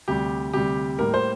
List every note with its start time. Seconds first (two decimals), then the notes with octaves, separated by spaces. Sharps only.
0.08 D2 C3 G3 G4
0.53 D2 C3 G3 G4
0.99 A2 G3 A#3 A#4
1.14 C5